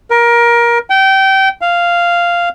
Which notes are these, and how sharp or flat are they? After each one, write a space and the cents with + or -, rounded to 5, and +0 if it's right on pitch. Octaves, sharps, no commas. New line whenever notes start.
A#4 +20
G5 -25
F5 -5